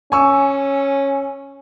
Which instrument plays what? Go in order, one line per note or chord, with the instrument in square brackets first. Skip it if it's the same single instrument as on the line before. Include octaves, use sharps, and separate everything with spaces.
[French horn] C#4 [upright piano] G#5 C#6 E6